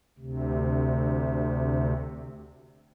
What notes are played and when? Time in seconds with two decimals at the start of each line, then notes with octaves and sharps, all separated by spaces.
0.19 D2 C3